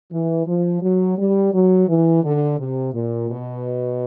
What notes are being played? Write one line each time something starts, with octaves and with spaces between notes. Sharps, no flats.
E3
F3
F#3
G3
F#3
E3
D3
C3
A#2
B2